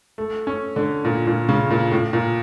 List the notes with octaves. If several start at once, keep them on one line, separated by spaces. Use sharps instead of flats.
A3
C#4
D3
A#2
A#2
C#3
A#2
A2
A#2